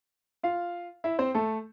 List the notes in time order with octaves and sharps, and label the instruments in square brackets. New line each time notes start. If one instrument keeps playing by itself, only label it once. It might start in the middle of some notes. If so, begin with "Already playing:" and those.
[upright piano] F4 F5
E4 E5
C4 C5
A3 A4